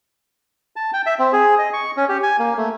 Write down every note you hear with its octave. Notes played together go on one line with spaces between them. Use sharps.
A5
G5
E5
C4
G#4
D#5
C#6
C#4
G4
G#5
A#3
A3